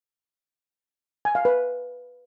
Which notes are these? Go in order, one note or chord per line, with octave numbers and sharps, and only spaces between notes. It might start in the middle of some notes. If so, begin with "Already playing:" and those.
G#5
F5
B4